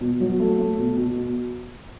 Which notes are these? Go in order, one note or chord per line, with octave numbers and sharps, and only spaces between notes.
B2
F#3
A3
A3
B2
B2